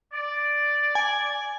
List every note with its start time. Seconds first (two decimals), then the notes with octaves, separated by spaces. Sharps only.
0.13 D5
0.95 G#5